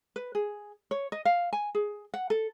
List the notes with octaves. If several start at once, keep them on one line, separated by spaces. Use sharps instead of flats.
B4
G#4
C#5
D#5
F5
G#5
G#4
F#5
A4